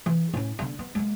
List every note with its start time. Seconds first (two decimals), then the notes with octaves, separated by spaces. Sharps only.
0.06 E3
0.34 A2 C#4
0.59 D3 B3
0.79 B3
0.95 G#3 A#3